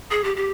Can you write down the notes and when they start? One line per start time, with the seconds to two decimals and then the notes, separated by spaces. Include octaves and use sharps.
0.11 G#4
0.24 G4
0.36 G4